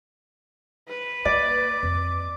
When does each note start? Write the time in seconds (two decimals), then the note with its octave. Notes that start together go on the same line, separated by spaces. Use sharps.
0.88 B4
1.25 A#3 D5 D6
1.83 F2